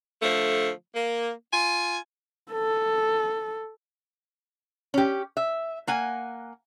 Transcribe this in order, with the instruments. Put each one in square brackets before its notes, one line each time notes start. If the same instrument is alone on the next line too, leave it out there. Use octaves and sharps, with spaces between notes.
[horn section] D3 F3 A3
A#3
F4 G#5
[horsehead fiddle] A4
[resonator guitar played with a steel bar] C#4 G4
E5
A#3 F#5 G#5